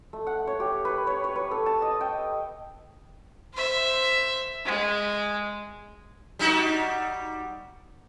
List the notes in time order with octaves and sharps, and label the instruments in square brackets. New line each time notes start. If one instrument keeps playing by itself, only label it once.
[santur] A3
F#5
C#5
G4
B4
C#5
C#5
B4
A4
A5
D#5
G5
[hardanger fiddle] C5 E5
G#3
[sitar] G3 D#4 F#4